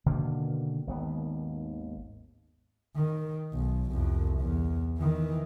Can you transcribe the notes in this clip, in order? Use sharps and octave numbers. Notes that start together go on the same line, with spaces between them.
B2 D3 D#3 A#3
G#1 D#2 B3
D#3
B1
C2 F2
E2
D#3 E3